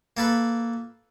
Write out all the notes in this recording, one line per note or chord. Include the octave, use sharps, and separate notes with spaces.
A#3 A4 B4